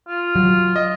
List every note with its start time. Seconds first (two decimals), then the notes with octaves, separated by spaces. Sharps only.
0.08 F4
0.36 F#3
0.76 D#5